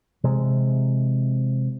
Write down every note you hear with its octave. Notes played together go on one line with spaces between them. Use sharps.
C3 E3 G#3